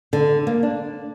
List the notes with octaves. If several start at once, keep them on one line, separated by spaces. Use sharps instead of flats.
D3
A#3
D4